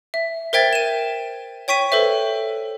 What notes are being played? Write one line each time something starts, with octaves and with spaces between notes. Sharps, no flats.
E5
A#4 C5 E5 G5 G#6 A6
D#7 E7
C#5 G5 C#6 B6 D#7
A4 B4 C5 E5